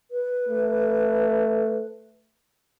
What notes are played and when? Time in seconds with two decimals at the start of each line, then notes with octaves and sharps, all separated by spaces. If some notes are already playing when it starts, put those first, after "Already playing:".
0.11 B4
0.49 A3